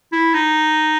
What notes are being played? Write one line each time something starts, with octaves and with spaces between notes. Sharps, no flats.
E4
D#4